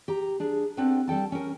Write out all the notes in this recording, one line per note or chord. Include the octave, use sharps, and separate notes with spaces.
G4 A#5
D4 G#4
B3 C4 D4 G4 A4 B4
G3 A4 G5 A5
C#4 A#4